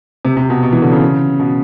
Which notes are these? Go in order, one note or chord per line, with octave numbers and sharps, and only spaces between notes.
C3
C3
B2
B2
E3
D3
C#3
B2